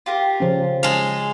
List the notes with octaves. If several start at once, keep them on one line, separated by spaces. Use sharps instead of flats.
F4 G4 A#4
C#3 F3 C#4
G#3 F5 A5 G6